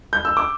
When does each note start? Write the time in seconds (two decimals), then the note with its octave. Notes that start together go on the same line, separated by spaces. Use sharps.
0.13 G6
0.25 E6
0.37 D6